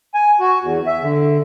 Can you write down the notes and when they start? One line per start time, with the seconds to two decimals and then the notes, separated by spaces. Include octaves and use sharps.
0.14 G#5
0.40 F#4
0.62 E2
0.87 E5
1.02 D3